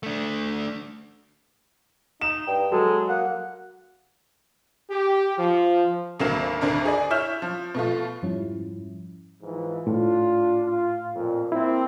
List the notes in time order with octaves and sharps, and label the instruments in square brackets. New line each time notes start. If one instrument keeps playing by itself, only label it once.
[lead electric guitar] A3 D4
[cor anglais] D#4 [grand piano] E7
[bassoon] G2 [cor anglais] G5
[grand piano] F#3 [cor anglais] G#3 [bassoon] A4
[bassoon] A#3 [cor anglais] F#5
[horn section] G4
F3
[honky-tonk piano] G#1 D2 F#3 A#3 F5 E7
G#1 D2 D4 A#4
G#4 D5
E4 C#5 E5 F6 G6 E7
F3
B2 A3 F4
[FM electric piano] F2 G#2 F3 G3 C#4 E4
[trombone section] G#2 E3 F3
[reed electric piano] A2 [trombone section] D4 F4
[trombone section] F4
F2 A#2
[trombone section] A#3 C4 [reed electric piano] E4